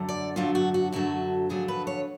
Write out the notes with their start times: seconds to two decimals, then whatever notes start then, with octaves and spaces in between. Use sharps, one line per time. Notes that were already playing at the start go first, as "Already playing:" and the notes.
Already playing: F#2 D3 F#3 A3
0.09 D5
0.36 F#2 D3 F#3 A3 F4
0.55 F#4
0.74 F#4
0.92 F#2 D3 F#3 A3 F#4
1.49 F2 D3 F#3 A3 G#4
1.68 B4
1.87 C#5